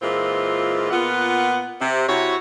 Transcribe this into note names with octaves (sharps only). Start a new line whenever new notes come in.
A#2 E3 G#3 C4 F4
A#2 B3 F4 F#5
C3
C3 E4 F#4 C#5